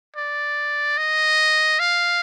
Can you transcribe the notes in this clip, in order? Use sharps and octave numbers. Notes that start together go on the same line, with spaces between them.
D5
D#5
F5